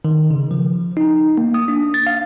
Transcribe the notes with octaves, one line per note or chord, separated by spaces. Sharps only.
D#3
C#3
F3
D#4
A#3
D#6
D4
A6
F5